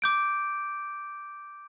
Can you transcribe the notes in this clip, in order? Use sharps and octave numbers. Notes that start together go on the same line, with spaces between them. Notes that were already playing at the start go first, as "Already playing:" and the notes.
D6 G6 D7